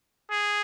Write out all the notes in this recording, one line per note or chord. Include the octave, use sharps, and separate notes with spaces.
G#4